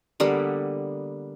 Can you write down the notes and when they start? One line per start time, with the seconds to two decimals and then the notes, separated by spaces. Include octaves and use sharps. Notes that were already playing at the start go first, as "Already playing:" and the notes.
0.20 D3 G3 A#3 B3